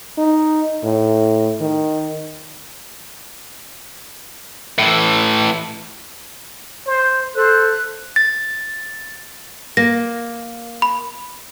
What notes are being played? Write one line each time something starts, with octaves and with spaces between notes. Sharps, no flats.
D#4
A2
D#3
A2 E3
C5
A4 C5 F#6
A6
A#3 A#6
B5